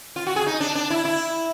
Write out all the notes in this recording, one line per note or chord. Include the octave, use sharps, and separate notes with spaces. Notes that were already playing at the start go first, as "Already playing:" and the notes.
F4
F#4
G#4
D#4
D4
D4
E4
E4